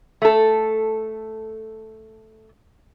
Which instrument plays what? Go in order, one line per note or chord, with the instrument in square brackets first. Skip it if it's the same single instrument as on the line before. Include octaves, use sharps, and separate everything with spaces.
[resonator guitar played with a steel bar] A3 A4